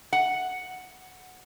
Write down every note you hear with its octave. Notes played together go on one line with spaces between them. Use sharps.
F#5